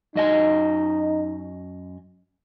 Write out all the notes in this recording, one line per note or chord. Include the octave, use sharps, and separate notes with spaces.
F#2 D#4 D#5 G#5